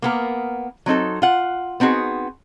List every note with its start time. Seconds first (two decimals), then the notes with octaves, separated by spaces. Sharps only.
0.02 A#3 B3 A#4
0.86 F#3 C4 D#4 A4
1.22 F4 F#5
1.80 B3 C4 D#4 F#4 G#4